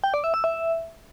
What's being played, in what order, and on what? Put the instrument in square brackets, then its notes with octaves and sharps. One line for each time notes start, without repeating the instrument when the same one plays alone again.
[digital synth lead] G5
D5
E5
E6
E5